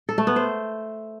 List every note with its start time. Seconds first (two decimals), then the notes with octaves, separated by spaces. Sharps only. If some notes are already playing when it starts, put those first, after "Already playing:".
0.09 A4
0.18 A3
0.27 B3
0.36 C5